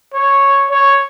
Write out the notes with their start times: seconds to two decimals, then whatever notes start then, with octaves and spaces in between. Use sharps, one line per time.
0.14 C#5
0.70 C#5